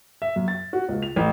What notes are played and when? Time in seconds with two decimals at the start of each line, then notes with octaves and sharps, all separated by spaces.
0.22 E5
0.36 F#2
0.48 A6
0.73 F#4
0.89 C#2
1.02 F7
1.16 A1